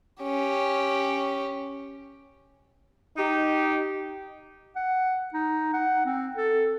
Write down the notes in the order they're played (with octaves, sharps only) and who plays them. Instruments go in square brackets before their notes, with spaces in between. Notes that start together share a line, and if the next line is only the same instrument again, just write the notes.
[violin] C#4 G4
[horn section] D#4 G4
[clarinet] F#5
D#4
F#5
C4
A4